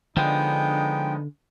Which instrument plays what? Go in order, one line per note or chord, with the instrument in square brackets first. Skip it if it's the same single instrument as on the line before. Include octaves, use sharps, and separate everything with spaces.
[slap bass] D3 [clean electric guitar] F3 G#3 [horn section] B3 D4 D#4 [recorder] G5